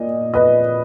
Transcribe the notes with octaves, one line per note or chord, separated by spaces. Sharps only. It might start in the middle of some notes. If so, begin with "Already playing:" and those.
Already playing: A#2 D#5
B4 D#5